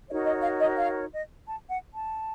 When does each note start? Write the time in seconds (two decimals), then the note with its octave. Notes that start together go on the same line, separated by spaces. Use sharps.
0.08 D#4 F#4 A#4 C#5 D#5
0.25 D#5
0.43 F5
0.60 D#5
0.77 F5
1.12 D#5
1.47 A5
1.70 F#5
1.93 A5